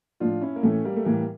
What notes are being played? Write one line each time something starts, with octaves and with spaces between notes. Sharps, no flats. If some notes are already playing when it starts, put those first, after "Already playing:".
A2 F3 D4 F4
C#4 E4
A#3
A2 E3 A3 C#4
G3 A#3
A3
A2 E3 G3 A#3